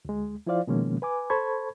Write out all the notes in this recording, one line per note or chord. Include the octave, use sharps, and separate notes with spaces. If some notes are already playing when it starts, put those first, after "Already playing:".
D2 G#3
F3 E4 F4 C5 D5 F5
B2 D#3 F3 G#3 A#3 C#4
B4 G#5 D6
A4 C5 A5 B5 C#6 G#6